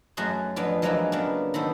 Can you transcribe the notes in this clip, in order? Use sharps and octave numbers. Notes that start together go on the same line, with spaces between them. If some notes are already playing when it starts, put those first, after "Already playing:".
F#2 F#3 A3 F#4 G#4 C6
F2 B3 D4 F4
F3 F#3 G#3 A#3 E4 F4
C#3 A#3 B3 D4
D#3 B3 A4 C5